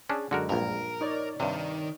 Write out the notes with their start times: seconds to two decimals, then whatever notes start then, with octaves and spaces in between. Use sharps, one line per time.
0.09 C#4 D4 G#4
0.31 F#2 D3 G#3 F#4 A#4
0.49 A#1 G2 A#4
1.01 D#4 C#5 D5
1.40 G2 C3 D#3